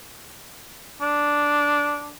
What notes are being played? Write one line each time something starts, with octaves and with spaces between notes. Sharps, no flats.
D4